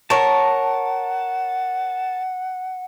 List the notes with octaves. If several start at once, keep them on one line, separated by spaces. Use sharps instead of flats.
A#4 C#5 F#5 A5